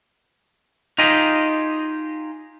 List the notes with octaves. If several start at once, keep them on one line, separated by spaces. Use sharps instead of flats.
D#4 F4 G4 G#4 D#5